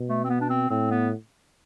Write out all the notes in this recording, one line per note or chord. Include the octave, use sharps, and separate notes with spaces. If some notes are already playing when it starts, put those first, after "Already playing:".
Already playing: B2
A3
C4
B3
D4
C4
A2 C4
B3